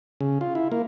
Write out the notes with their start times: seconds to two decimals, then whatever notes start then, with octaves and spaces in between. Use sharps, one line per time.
0.21 C#3
0.41 F4
0.55 E4
0.72 A#3